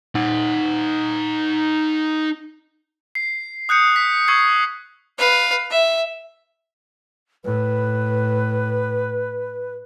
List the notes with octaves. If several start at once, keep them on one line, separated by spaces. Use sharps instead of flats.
D#4 F#5
C7
D#6 F#6 G6 C#7
B6
C#6 E6 G#6 C7
B4 F5
E5
A2 B4